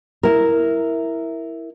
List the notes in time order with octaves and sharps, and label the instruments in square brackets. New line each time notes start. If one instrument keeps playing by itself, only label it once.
[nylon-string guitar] E4 A#4